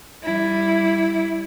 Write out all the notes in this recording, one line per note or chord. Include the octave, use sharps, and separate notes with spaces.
G3 E4